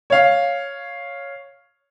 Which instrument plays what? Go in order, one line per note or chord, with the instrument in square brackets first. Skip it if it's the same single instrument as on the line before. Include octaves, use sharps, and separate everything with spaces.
[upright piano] C#5 F5